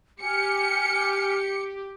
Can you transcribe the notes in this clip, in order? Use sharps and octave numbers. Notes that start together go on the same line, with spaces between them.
G4 G#5 F6 C#7